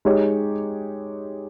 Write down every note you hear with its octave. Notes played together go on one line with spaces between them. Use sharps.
G#3 D#4 G4 C#5